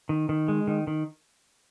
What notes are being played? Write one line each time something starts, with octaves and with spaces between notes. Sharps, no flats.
D#3
D#3
G#3
D#3
D#3